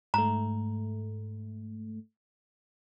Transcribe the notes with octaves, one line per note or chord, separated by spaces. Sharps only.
G#2 A3 A#5